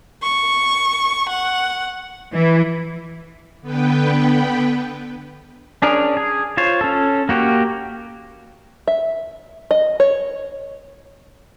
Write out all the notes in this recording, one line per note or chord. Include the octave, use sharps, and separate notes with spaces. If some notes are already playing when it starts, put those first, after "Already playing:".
C#6
F#5
E3
D3 B3 B4 G5
C#4 D4 G#4 A#4
G#4
F4 C5 C#5
C#4 A4
A#3 F#4 G4
E5
D#5
C#5